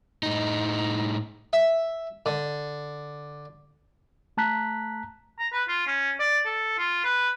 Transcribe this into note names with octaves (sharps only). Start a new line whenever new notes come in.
A2 D#4
E5
D3
A3 A5 A#5 F#6 B6
A#5
B4
F4
C#4
D5
A4
F4
B4